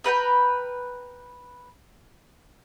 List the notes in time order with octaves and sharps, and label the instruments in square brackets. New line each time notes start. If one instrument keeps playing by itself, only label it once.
[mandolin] A#4 B4 F#5 G5